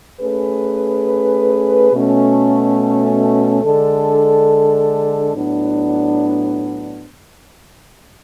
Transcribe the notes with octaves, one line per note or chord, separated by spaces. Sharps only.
A3 C#4 G#4 B4
B2 A3 C#4
D3 G#3 D4 A4
A2 F#3 B3 D4